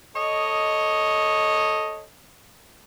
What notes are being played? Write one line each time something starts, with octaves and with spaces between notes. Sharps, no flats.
A4 C#5 D#5